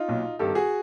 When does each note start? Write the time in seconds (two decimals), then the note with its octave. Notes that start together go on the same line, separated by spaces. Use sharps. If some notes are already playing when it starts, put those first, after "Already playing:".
Already playing: D#4 F4
0.08 B1 A#2
0.39 G#1 G2 D#3 G4 A4
0.55 F#4 G#4